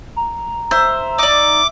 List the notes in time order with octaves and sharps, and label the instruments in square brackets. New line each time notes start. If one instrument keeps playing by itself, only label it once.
[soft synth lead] A#5
[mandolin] C5 [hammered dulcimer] E5
[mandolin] D#4 D5 [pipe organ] D6